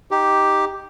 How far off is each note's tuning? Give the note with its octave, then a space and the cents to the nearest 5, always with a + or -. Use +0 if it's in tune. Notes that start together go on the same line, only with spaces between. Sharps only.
D#4 +0 G4 +0